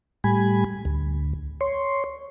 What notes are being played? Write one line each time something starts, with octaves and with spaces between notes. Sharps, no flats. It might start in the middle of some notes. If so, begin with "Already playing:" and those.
A2 G3 G#5 B5
D2
C#5 C6